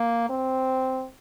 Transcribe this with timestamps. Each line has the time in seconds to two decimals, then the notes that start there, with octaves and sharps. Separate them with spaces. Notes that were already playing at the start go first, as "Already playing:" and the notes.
Already playing: A#3
0.30 C4